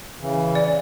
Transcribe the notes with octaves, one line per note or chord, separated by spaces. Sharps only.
C#3 E3
D5